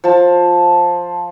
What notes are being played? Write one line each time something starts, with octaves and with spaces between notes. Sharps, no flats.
F3 A5